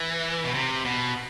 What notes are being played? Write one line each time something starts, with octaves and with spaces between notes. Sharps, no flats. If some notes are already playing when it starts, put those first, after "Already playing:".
Already playing: E3
B2
C3
B2